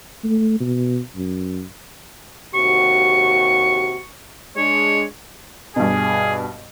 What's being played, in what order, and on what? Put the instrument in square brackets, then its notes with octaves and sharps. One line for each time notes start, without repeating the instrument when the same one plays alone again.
[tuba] A3
B2
F#2
[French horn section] D#2 C3 F#4 [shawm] C#6
[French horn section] G#3 D4 [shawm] C#5
[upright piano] G2 B2 [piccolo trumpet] G#4